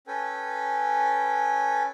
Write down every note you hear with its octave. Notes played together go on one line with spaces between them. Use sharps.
C#4 A4 B4 G5 G#5